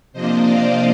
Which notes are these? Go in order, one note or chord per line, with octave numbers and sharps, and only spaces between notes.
C3 F3 A#3 D4 C5 D#5
D5 F5